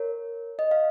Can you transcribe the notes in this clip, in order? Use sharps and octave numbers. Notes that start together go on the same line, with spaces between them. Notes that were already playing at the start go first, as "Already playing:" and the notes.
Already playing: A#4 C#5
D#5
F5